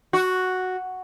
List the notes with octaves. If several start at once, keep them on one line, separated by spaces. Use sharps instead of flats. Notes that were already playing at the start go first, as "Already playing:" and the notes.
F#4